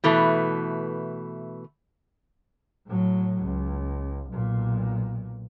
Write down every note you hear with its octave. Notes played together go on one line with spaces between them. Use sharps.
B2 E3 A3
A2 F#3
C#2
B1 A#2